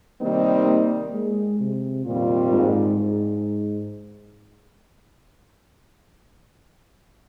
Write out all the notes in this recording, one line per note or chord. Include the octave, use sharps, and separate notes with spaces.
C3 D#3 G3 A#3 C4 D#4
A#3
G#3
C3
F2 A#2 D#3 G3 C4 F4
G#2
G#2